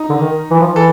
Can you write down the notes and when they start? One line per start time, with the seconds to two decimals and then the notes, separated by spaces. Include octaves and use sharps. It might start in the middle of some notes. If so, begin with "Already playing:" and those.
Already playing: D#4
0.10 D3
0.21 D#3
0.51 E3
0.61 F3
0.71 E3
0.76 A4